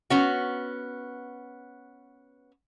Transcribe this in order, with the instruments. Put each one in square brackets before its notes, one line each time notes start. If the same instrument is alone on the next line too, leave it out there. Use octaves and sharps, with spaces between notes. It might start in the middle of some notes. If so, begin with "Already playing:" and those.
[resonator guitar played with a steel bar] B3 C#4 F#4